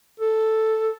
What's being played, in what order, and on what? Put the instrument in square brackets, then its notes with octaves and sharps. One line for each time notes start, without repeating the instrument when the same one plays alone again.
[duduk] A4